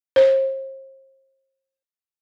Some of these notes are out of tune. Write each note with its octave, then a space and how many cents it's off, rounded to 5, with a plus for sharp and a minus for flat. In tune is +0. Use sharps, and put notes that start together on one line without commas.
C5 +40